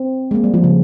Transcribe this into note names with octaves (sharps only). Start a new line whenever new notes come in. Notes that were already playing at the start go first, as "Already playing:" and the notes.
Already playing: C4
G#3
A#3
G3
F3
C#3